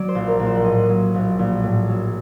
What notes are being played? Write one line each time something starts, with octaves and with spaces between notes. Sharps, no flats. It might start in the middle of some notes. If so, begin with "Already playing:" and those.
Already playing: F#3 D5
C5
A#1
A#4
A#1
C5
F#5
A2 D#5
F#3
A#1
A#1
A2
F#3